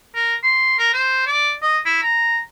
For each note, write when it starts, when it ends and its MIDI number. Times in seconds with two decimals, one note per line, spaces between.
0.15 0.35 70
0.43 0.76 84
0.79 0.89 70
0.93 1.25 72
1.27 1.53 74
1.62 1.79 75
1.86 2.01 64
2.03 2.39 82